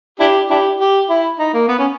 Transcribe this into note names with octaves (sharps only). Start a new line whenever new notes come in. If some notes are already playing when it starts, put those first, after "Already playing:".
D4 E4 G4
D4 E4 G4
G4
E4
D#4
A#3
B3
C#4